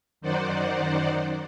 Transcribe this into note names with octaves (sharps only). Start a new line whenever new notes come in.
F#2 D#3 D#4 C5 D5 F#5